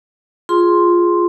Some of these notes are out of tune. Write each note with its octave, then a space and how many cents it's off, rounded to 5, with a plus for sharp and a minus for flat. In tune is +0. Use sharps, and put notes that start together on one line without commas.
F4 +0 G#4 +0 C6 +0